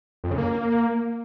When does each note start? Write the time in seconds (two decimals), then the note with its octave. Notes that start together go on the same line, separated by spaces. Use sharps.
0.24 F2
0.31 C#3
0.38 A#3